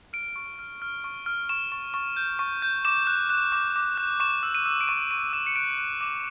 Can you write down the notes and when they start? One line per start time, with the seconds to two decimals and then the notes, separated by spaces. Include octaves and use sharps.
0.13 F6 D7
0.36 C#6
0.59 F6
0.82 F6
1.04 C#6
1.26 F6
1.49 C#6 E7
1.72 C#6
1.94 C#6
2.17 G6
2.39 C#6
2.62 G6
2.85 D6 E7
3.07 F#6
3.30 F#6
3.52 D6
3.76 D6
3.98 F#6
4.20 C#6 E7
4.43 E6
4.55 D#7
4.66 E6
4.81 D7
4.88 C#6 D#7
5.11 C#6 D#7
5.33 E6 E7
5.47 C#7
5.56 F#6 D7
5.79 F#6
6.01 D6